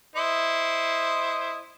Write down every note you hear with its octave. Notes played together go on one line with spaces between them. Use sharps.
E4 C5 D#5